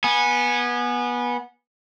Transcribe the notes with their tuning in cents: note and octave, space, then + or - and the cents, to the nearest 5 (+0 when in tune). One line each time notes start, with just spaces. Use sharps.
B3 -20 G#5 +0